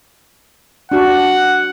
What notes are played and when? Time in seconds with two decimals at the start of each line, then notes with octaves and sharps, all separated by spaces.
0.92 D4 F#4 F#5